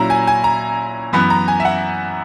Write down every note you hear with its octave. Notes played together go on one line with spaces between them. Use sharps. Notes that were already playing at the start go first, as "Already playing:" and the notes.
Already playing: A#2 F#3 C#4 E4 A#5
G#5
G#5
A#5
F#2 E3 B3 B5
A#5
G#5
E5
F#5